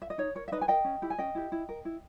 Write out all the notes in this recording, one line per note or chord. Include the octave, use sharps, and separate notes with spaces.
E5
D#5
D#4 C#5
A#4 C#5
E5
D#4 B4 D#5
G#5
A#4 D#5 G5
C#4
E4 G4
G#5
C#4 D#5 G5
E4 G4
E4
A#4
E4